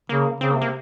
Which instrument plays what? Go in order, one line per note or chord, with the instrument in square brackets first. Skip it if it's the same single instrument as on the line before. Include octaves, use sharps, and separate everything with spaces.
[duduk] C#3 [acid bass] A#3
[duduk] C#3 [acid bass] C4
[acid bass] A#3
[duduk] C3
[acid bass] A#3